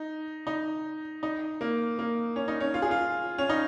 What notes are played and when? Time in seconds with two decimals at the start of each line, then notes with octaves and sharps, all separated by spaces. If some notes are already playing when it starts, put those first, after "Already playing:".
Already playing: D#4
0.47 D#4
1.23 D#4
1.61 A#3
1.99 A#3
2.36 C#4
2.48 D#4
2.60 C#4
2.74 F4
2.82 G#4
2.91 F4
3.38 C#4
3.49 D#4